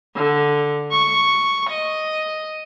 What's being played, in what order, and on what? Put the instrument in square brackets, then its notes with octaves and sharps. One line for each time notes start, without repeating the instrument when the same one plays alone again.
[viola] D3
C#6
D#5